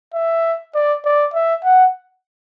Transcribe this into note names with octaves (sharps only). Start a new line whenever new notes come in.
E5
D5
D5
E5
F#5